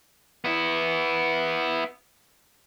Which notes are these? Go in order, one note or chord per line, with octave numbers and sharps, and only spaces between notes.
B3 E4